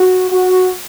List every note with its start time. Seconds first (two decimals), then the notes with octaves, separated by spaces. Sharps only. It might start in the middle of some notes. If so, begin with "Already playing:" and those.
Already playing: F#4
0.31 F#4